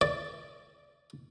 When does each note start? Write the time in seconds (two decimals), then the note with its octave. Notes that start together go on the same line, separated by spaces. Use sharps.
0.01 D5